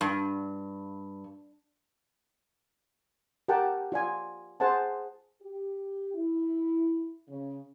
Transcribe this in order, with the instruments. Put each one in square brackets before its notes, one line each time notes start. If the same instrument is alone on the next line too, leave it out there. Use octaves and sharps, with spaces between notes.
[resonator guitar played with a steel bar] G2
[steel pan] G4 A#4 F#5 G5 A5
F4 D5 G#5
G#4 C5 F#5 G#5 A5
[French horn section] G4
E4
C#3